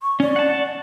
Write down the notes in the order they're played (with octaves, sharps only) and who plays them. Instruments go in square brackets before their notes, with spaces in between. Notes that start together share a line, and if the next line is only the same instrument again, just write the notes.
[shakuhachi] C#6
[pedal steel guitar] C#4 [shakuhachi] D5
[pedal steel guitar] F#5 A5